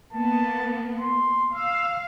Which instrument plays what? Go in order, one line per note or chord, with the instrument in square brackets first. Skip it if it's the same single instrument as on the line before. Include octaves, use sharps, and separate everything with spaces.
[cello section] A#3 B3 [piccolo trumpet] A5
[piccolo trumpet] C6
[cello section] F5 [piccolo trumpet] E6